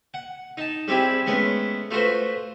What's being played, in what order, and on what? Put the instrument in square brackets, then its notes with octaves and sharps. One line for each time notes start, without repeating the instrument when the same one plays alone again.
[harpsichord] F#5
D#4 A5
G3 C4 E4 G4 G#4
G#3 A3 B3 C#4
A3 F4 F#4 B4 C5